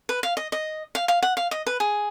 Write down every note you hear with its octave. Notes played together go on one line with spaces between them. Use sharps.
B4
F5
D#5
D#5
F5
F5
F#5
F5
D#5
B4
G#4